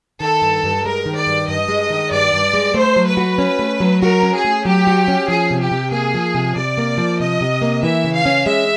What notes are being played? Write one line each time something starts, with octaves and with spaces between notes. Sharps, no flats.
D#3 A4
G2
G2
G#3 A#4
D#3
D5
G2
G2 D#5
G#3
D#3
G2 D5
G2
G#3
A3 C5
F#3
B4
F#4
C#4
A3
F#3
F#4 A#4
C#4
G#4
A3
F#3 G4
F#4
C#4
F3 G#4
C3
G4
C3
A#3 G#4
F3
C3
C3 D5
A#3
F3
C3 D#5
C3
A#3
E3 E5
C#3
F5
C#4
G#3 E5